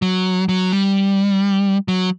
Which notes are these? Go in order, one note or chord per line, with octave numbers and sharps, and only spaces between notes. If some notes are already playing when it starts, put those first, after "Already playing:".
F#3
F#3
G3
F#3